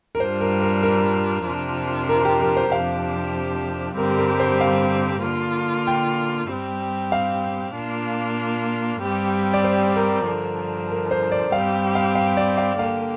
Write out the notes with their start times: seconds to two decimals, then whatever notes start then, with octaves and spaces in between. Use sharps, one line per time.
0.15 A#4
0.20 G2 G3 D4 F4 C5
0.41 A#4
0.62 A#4
0.83 A#4
1.46 F2 C3 F3 D4 F4
2.09 A#4
2.25 G4
2.40 A#4
2.56 C5
2.72 F2 C3 F3 D4 G4 F5
3.97 G2 D3 G3 C4 G4 A#4
4.19 A#4
4.40 C5
4.61 F5
5.24 D3 A#3 F4
5.87 G5
6.49 G2 G3 C4 G4
7.12 F5
7.75 A#2 A#3 D4 F4
9.02 G2 G3 C4 G4
9.54 D5
9.64 C5
9.96 A#4
10.27 G2 D3 F3 D4
10.90 A#4
11.11 C5
11.32 D5
11.52 G2 G3 C4 G4 F5
11.95 F5
12.15 F5
12.37 D5
12.58 F5
12.79 D3 A#3 G4 F5